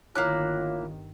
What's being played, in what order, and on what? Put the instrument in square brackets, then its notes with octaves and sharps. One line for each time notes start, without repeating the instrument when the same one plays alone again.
[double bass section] G1 D#3 [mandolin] A#3 E4 F#6 [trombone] F4 [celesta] C#5 D6